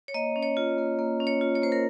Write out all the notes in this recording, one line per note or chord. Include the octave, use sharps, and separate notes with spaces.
C#5
A#3 D#5
C#4
C#5
F4
A#3
A#3
C#4
C#5
F4
C#5
A#3 C5
A#4